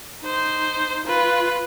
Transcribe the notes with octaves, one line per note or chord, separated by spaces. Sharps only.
D#4 C5
F4 B4